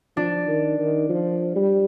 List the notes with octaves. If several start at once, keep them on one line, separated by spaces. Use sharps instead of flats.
F3 D4
D#3
D#3
F3
G3